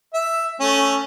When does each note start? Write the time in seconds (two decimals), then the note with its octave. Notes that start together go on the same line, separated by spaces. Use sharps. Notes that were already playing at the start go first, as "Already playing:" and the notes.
0.14 E5
0.60 A3 C#4